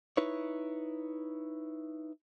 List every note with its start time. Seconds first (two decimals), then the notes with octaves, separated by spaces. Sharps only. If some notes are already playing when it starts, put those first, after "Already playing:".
0.17 D#4 E4 B4 C#5